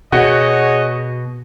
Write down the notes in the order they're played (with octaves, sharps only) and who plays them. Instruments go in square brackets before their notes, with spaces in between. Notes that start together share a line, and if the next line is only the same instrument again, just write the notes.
[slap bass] B2 [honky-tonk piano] F#4 [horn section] G#4 C#5 D#5